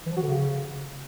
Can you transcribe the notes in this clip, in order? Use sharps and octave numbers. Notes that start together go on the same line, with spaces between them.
E3
F3
F#4
D3
C#3